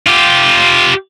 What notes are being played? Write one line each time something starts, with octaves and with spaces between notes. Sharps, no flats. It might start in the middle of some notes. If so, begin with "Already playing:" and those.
F4 G4